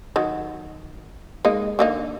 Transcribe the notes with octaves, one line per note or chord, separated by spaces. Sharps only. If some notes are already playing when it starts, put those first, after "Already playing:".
D#3 F#3
G#3 A#3 D#4
D3 A#3 D#4